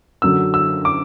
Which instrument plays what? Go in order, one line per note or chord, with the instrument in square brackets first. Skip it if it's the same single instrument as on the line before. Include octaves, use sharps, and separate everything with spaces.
[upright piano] F#2 D3 F#3 [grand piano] E6
[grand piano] E6
D6